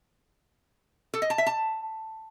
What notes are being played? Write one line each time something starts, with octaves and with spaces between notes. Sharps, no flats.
A4
D#5
A5
E5
A5